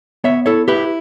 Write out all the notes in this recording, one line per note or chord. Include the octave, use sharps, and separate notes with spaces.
B3 C#5 E5
E4 A4 C#5
E4 G4 B4